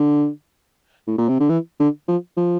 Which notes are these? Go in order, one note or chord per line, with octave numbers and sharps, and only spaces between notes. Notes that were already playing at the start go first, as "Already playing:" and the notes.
Already playing: D3
A2
A#2
C3
D3
E3
D3
F3
F3